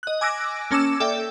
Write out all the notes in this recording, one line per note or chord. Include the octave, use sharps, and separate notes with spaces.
D#5 F#6
G#5 D6 E6 F#6 A#6 D7
A#3 C#4 A5 D6 E6 E7
A4 D5 E5 G5